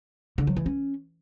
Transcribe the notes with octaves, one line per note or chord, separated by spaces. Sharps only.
D3
F#3
E3
C#4